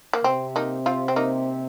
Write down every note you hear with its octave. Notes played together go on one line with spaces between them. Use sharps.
A#3
C3 C4
A#3 D#4
C4 F4
C4
A#3 D#4